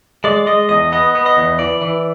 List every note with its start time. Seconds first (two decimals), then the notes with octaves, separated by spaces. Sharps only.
0.24 G#3 D5
0.47 G#3 D#5
0.69 E2 D#5
0.92 B3 D#5
1.15 B3
1.26 D#5
1.37 E2
1.59 E3 D5
1.82 E3